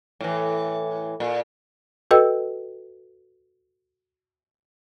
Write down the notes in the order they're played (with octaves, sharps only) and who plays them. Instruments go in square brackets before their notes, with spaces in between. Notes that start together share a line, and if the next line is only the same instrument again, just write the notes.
[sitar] A2 E3
A#2
[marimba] F#4 A4 B4 D#5 G5 E6